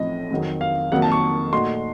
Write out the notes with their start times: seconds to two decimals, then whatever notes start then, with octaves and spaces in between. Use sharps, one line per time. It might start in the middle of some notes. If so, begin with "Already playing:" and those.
Already playing: A1 A2 F3 C4 D#4 D#5
0.31 F2 D#3 F#3 C4
0.61 F5
0.92 F2 D#3 F#3 A#3 F#5
1.02 A5
1.12 C#6
1.52 A#2 A3 D#4 F#4 C6